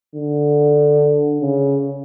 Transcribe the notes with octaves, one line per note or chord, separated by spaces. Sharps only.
D3
C#3